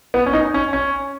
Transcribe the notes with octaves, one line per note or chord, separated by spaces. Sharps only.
B3
C#4
D#4
C#4
C#4